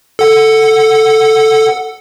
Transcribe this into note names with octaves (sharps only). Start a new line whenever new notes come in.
A4 F#5